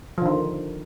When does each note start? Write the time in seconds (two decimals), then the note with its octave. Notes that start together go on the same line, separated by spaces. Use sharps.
0.18 F3
0.22 D3
0.26 D#3